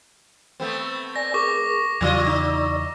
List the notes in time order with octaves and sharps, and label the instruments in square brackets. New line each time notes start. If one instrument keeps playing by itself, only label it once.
[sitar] A3 B3 C4
[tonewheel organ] D5 G#5 [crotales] A#6
[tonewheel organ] G#4 A#4 [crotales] C#6 D6 A#6
[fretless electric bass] E2 C#3 E3 [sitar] F#3 F4 D#5 [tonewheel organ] D5 E6
[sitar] D#4